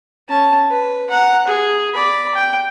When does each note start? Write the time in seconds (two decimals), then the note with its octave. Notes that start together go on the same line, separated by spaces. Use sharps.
0.29 C#4 A5
0.70 B4
1.10 F#5 A#5
1.47 G#4
1.95 D5 B5
2.35 G5